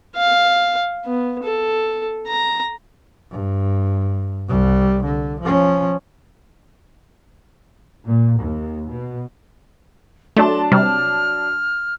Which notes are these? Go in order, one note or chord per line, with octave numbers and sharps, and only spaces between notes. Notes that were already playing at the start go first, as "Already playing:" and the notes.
F5
B3
A4
A#5
G2
C2 G3
D3
F3 C#4
A#2
D#2
B2
F#3 A3 D4 A5 C6
C3 G3 F6